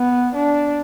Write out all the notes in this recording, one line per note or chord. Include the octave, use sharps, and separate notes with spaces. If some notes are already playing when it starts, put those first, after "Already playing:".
Already playing: B3
D4